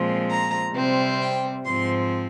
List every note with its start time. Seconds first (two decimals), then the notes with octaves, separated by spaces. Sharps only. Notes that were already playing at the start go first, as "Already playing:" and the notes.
Already playing: A#2 F3 G#3 C4
0.28 A#5
0.73 C3 G3 C4
1.20 G5
1.65 G#2 F3 C4 C6